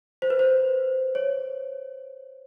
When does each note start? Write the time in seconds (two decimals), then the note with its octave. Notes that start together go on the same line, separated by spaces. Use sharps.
0.22 C5
0.30 B4
0.39 C5
1.15 C#5